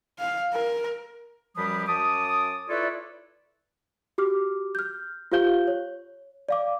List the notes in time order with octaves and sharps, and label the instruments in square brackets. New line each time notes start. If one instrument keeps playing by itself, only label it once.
[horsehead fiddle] F5
A#4
[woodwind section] F#2 F3 G3 G4 B4 D#6
F#2 A5 D6 D#6
E4 F4 A4 B4 C#5 D5
[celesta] F#4 G4 D6 F6
F6 G6
F4 G4 C5 F5 G6 G7
C#5
D5 F5 D6